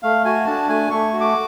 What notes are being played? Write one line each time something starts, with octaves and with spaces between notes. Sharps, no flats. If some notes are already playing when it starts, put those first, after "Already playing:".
A3 F5
F#4 G#5
D4 A5
A3 G#5
A3 C#6
F#4
D6